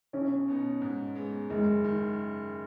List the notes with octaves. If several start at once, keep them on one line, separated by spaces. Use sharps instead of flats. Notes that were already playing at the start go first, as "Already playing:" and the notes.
B1 C#4
B2 B3 D#4
G#2
G#3 B3
F#1 G#3
D#3